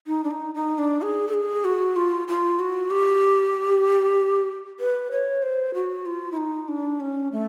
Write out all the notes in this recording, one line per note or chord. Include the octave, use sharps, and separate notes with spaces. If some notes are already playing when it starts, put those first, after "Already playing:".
D#4
D4
D#4
D#4
D4
G#4
A4
G#4
F#4
F4
F4
F#4
G4
B4
C#5
C5
F#4
F4
E4
D#4
D4
C#4
A3